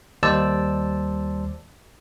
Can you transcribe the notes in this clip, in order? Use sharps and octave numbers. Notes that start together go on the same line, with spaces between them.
D#2 G3 C5 D5 A5 E6